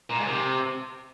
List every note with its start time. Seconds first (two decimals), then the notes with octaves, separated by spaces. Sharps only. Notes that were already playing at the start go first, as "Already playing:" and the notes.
0.10 A#2
0.18 G#2
0.26 C3